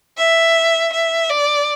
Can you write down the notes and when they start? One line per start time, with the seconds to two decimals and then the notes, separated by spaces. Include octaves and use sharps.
0.18 E5
0.93 E5
1.30 D5